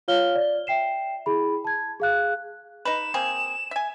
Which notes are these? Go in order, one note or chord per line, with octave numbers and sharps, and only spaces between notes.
F4 C#5 F5 F6 G7
D5
E5 G5 C7 E7
E4 G#4 B5
A5 G#6
G#4 F5 F#6
D#4 B4 E7
A#3 C4 G#4
E5 G#5